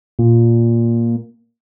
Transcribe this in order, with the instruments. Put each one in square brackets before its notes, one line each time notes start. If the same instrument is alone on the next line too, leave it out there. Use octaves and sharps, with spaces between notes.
[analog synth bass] A#2